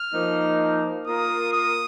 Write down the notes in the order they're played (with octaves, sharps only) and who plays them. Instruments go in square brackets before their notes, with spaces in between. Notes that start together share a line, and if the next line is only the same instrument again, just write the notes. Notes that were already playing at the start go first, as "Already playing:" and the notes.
Already playing: [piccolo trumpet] F6
[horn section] F3 A#3 D#4
[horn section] A#3 F4 A#4 [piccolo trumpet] D#6
[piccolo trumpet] D#6